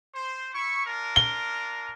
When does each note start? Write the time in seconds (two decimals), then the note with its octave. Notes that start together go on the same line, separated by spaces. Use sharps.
0.13 C5
0.53 E4 C#6
0.86 D4 F4 A#4
1.16 G7